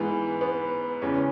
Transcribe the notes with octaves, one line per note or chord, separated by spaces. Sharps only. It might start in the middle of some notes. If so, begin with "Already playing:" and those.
Already playing: G#2 E3 B3
B3
E2 C#3 E3 C#4